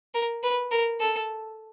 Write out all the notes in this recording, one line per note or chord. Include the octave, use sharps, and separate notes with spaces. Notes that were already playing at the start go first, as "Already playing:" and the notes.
A#4
B4
A#4
A4